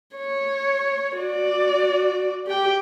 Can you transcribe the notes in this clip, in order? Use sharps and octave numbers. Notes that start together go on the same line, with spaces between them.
C#5
F#4 D5
G4 G5